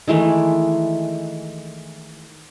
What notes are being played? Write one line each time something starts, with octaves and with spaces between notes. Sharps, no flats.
D#3 E3 G#3 A3